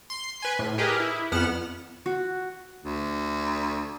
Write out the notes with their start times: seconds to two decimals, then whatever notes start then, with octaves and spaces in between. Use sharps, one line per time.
0.10 C6 C7
0.40 B4 G#5 C6
0.59 A2
0.78 G4 G#4 A#4 B4 D#5
1.00 E4
1.32 F2 B3 F#5 F6 E7
2.06 F#4
2.85 D2